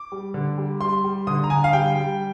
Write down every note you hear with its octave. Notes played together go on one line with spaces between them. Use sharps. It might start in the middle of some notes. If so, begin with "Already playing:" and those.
Already playing: D6
G3
D3
G3
G3 C6
G3
D3 D#6
A#5
D3 G#5
F5
G3 G5
G3